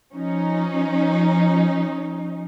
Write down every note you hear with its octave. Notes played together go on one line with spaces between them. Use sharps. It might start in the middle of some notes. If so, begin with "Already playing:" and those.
F3 C#4 D#4